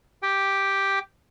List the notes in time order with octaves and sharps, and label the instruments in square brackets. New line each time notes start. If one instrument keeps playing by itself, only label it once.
[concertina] G4 G5